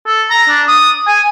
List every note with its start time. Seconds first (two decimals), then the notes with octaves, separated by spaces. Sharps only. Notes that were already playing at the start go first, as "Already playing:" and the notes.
0.07 A4
0.30 A#5
0.48 D4
0.68 D#6
1.07 G#5